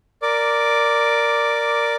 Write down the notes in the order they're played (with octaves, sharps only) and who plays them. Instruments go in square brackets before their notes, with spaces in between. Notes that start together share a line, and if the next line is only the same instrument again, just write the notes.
[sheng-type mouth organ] A#4 D5 D6